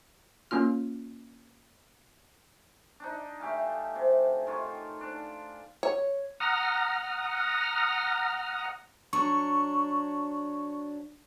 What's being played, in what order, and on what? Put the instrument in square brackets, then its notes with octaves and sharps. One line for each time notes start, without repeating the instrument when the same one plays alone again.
[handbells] A#3 C#4 F4 F6
[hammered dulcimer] D4 D#4
A3 G4 F5 G#5
C3
D#3 F4 C#5
D4
[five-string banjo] C#5
[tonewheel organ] F#5 A#5 D#6 F6
[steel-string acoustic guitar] F#3 D4 [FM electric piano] C#6